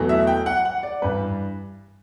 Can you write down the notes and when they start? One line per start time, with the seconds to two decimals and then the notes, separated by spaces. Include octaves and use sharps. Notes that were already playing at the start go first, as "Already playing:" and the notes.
Already playing: E2 B2 F#3 A3
0.09 E5
0.27 G5
0.46 F#5
0.65 F#5
0.83 D5
1.02 G2 E3 G3 B4